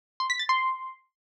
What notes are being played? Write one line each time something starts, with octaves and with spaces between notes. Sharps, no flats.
C6
B6
A6
C6